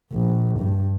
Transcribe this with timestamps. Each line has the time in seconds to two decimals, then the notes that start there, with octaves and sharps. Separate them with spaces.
0.12 A#1
0.59 G2